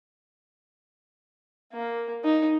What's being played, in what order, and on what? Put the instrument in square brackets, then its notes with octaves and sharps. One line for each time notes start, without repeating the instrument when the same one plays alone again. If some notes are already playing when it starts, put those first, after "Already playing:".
[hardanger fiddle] A#3
D#4